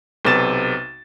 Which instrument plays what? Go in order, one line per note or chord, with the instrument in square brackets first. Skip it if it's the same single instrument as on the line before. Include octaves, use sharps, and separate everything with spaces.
[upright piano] B1 C3 B3 A6 E7